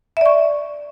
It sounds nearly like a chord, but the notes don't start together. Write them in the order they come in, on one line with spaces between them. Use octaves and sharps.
E5 D5 C#6